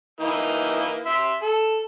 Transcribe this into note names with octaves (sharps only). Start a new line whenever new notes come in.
E3 A#3 D#4
E5 C6
A4